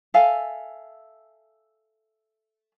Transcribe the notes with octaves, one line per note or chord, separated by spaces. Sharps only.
A4 E5 F5 G#5